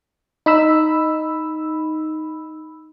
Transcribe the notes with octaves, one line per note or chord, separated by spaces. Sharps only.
D#4 B5 E6